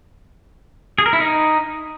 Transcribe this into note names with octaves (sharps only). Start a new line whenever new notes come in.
G#4
A#4
E4
D#4